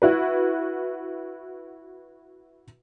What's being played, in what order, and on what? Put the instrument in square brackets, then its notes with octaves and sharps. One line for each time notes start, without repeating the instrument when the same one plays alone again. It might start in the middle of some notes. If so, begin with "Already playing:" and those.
[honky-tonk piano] E4 F#4 B4